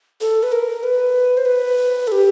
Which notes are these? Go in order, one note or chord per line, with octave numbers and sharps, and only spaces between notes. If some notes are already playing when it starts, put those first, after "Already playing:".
A4
B4
A#4
B4
C5
B4
A4
G4